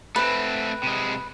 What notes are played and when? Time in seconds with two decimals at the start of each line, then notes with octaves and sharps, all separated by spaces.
0.16 A3 C4 B4
0.83 C3 G#3